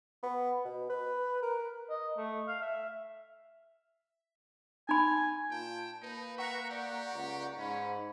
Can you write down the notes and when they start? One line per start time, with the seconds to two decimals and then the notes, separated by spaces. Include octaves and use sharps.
0.23 B3
0.65 B2
0.90 B4
1.42 A#4
1.90 D#5
2.17 A3
2.47 F5
2.62 E5
4.89 D#4 G#5 B5
5.51 A#2 G5 A5
6.02 A#3 D#4 B4
6.38 E5 F#5 A#5 C#6
6.70 G4 D5
7.15 C#2
7.58 G#2 C#4 B5